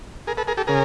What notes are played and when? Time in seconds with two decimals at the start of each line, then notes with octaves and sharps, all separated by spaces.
0.27 G#4 A#4
0.37 A4 B4
0.48 G#4 A#4
0.57 G4 A4
0.67 C#3 G#4 A#4